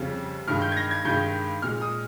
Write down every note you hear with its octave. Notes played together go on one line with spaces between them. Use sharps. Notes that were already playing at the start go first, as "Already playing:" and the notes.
Already playing: F2 C#3 G3
G2 D#3 G#3 F6
G6
G#6
A#6
G#6
G2 D#3 G#3 G6
A#2 G#3 F6
D#6